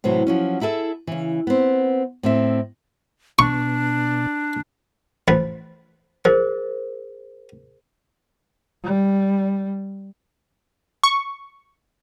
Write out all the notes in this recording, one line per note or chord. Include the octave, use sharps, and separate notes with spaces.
A2 C3 E3 F#3
F3 F#3 C#4
E4 G#4 A4 E5
C#3 E3
B3 C4
A2 C4 E5
B2 D4 C#6
A1 F3 B4
F3 G#4 A#4 C5
G3
C#6